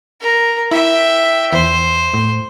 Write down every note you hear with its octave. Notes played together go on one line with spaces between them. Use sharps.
A#4
E4 E5 G5
E2 C5
A2